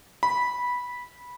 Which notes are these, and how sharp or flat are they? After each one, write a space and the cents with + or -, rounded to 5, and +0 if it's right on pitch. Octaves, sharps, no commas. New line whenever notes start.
B5 -10